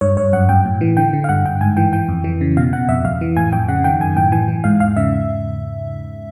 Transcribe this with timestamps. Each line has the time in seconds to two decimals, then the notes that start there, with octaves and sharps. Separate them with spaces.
0.01 G2 C#5
0.17 G2 C#5
0.33 F#2 F#5
0.49 F#2 G5
0.65 A2
0.81 E3
0.97 D3 G5
1.13 D3
1.24 F5
1.29 G2 F#5
1.45 G2 G5
1.61 G#2 G#5
1.77 E3 G5
1.93 E3 G5
2.08 F2
2.24 E3
2.41 C#3
2.57 B2 F5
2.72 B2 F#5
2.88 F2 E5
3.05 F2 F5
3.21 E3
3.37 A2 G#5
3.52 F2 G5
3.68 C#3 F#5
3.84 D#3 G5
4.00 F#2 G#5
4.16 A2 G5
4.32 E3 G#5
4.48 E3
4.64 G#2 F5
4.80 E2 F5
4.96 C#3 E5